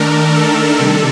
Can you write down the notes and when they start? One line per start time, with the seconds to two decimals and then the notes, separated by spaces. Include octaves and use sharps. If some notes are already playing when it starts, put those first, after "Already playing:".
Already playing: D#3 A3 D4 A#4
0.36 A4
0.79 C3 D#3 G3